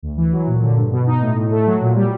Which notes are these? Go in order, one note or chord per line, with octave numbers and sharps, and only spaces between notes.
D2
E3
F#3
A#2
D3
G2
B2
D#4
A2
A2
A3
F#3
A#2
G3